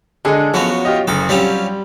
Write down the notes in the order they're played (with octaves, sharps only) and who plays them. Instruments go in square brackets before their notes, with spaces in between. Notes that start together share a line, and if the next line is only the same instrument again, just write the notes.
[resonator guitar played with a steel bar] D3 G#3 [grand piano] G#4 A4
[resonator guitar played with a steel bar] F#2 F#4 C#5 [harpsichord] F3 F#3 B3
[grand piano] F4 G4 D#5
[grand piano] F#1 C#3 [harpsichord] A4
[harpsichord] F#3 F4 G4 [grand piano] G3 [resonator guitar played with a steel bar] C4 C#4